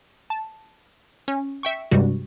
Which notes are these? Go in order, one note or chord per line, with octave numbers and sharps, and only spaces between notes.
A5
C#4
E5 G5 C#6
G2 C3 G3 G#3 F#4